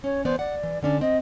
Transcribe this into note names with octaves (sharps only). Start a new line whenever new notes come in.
C#4 C#5
E3 B3 C5 D5
D5 F#5
E3
D3 C#4 D4 D5
C4 D#5